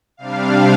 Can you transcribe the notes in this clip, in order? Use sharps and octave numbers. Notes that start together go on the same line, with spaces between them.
C3 G3 D4 F5